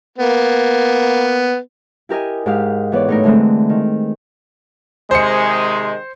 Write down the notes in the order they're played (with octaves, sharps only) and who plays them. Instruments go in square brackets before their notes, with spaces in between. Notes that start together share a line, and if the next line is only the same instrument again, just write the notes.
[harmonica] A#3 B3
[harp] E4 G4 A#4 D#5 G#5
G#2 G4 F5
E3 B3 C#5 D5
A2 D#4 A#4
D3 E3 G#3 A3 C4
D#3
[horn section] C3 D#3 G#3 [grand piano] C5 C#7